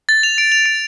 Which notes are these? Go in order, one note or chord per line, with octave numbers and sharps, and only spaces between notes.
A6
F7
D7
F7
D7